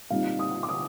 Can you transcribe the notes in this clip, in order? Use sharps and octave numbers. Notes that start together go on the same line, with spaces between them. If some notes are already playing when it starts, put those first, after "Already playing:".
A#2 G3 C4 D#4 F5
D#6
D6
D#6